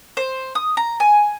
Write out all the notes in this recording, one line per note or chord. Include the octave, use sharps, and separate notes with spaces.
C5
D#6
A#5
G#5